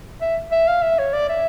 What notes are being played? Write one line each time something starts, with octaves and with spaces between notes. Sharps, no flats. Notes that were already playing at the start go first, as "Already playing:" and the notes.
E5
E5
F5
E5
C#5
D5
E5